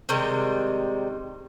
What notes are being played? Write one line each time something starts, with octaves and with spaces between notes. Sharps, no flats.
C3 D#3 G3 G#3